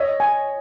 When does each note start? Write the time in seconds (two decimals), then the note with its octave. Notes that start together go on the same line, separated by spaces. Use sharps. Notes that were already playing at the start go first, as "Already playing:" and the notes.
Already playing: C#5 D#5 E5
0.20 G#5